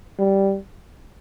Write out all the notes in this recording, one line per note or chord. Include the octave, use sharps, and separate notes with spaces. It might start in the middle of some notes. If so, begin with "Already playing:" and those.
G3